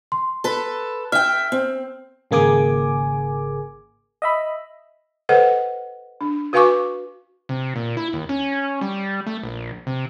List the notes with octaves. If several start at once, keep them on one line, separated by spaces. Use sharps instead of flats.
C6
A4 B4
E5 G5 F6
C4
G#1 C#3 A#3 G#4 G#5 D6
D#5 E5 B5
A4 B4 C5 D#5 F#5
D4
F#4 B4 F5 G#5 C#6 D6
C3
A#2
E4
D#2
C#4
G3
A3
A#1
C3